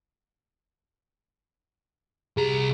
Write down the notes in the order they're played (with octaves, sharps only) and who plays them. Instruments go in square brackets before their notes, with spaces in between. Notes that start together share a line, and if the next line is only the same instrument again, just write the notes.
[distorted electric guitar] C2 A#5 [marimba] G4 G#4